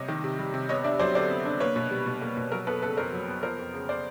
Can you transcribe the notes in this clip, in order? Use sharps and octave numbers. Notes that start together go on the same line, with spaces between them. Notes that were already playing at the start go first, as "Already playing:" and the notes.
Already playing: C3 G3 C#5 D#5
D#3
C3
G3
C3
B3 C#5 D#5
D4 D5 E5
F#3 C5 D5
D3 C5 D5
B3
D4
A#3 B4 C#5
B2
G3
B2
A#3
B2
F#3 A#4
B3 A4 B4
C#3 A4 B4
F2 A#4 C5
F#3
B3
F3 A#4 C5
F2
C#3
C5 D5